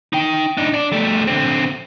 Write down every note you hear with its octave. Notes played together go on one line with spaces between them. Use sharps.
D#4 G5
D4 D#4
D4 D5
G3 A3
D3 C4